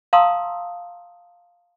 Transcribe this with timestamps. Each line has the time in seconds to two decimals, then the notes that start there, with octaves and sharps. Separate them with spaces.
0.13 F5 A5 A#5 C6 D#6 E6